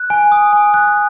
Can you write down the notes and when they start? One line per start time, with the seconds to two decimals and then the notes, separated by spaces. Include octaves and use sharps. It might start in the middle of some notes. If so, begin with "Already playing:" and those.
Already playing: F#6
0.10 G#5
0.32 D#6
0.53 G#5
0.74 F#6